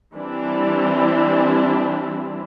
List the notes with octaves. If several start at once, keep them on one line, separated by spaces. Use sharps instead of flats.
E3 G3 C4 D4 E4